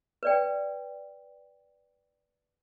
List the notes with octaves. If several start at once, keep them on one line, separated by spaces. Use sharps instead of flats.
B4 D5 G5